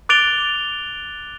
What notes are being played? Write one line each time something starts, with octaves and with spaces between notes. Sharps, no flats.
D6 F#6 A6 D7 F7 G7